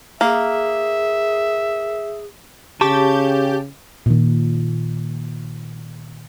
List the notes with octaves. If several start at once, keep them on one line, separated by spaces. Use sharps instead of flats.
A#3 G#4 E5
C#3 G4 A5 C#6 D6
A#2 D#3